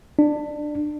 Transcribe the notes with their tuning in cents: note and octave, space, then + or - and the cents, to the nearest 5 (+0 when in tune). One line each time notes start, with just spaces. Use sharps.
D4 +20